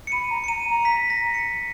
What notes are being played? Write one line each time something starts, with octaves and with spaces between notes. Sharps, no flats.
C#7
B5 D#7
A#5
C#7
A#5 D#7
A#5
B6
A#6
C#7